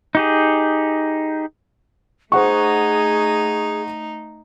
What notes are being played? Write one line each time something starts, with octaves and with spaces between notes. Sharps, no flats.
D#4 G4 G#4
A3 D#4 G#4 C5 F#5 C#6